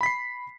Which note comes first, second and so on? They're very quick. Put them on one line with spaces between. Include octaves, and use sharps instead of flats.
B5 B6 C7